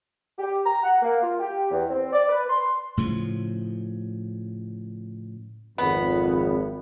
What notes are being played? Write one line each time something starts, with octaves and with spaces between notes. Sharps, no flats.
G4
A#5
F#5
A#3
F4
G4
E2
C4
D5
B4
C6
A2 C#3 F3
G#1 F2 B3